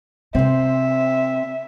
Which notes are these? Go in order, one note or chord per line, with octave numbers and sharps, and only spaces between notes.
C3 C4 C5 E5